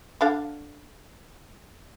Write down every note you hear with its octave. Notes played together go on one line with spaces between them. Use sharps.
D3 D4 F5